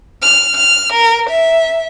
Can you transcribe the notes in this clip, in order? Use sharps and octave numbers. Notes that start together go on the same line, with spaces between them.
F6
F6
A#4
E5